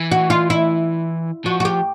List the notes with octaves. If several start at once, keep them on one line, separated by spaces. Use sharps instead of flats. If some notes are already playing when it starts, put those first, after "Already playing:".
Already playing: E3
F#4
F4
E4
F3 F#4
F#4
G4